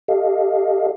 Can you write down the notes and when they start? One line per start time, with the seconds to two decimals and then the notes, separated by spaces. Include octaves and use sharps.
0.08 G4 A4 D#5 F5